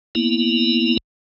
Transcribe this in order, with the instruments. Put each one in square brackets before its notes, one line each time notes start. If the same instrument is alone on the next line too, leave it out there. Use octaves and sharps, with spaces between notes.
[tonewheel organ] A#3 B3 E4